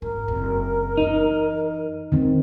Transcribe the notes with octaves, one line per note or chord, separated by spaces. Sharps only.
G#1 A#4
F#1 C4
F#2 E3 D#4
D#3 G#3 C4